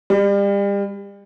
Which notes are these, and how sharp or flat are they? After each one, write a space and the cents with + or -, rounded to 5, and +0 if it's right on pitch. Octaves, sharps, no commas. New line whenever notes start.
G3 +35